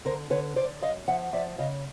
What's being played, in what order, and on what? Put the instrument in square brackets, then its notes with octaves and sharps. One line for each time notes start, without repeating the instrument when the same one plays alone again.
[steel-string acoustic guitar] D3 A#4 C5
D3 B4 C#5
D3 C5 D5
F#2 D#5 F5
F3 E5 F#5
F3 D5 E5
C#3 D#5 F5